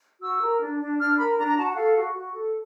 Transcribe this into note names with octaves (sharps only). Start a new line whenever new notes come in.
F#4 E6
A#4
D4
D4
D4 F6
A#4 B5
D4 A#5
A#5
F#4 A5
F#5
A4 F5
F#4
F#4
A4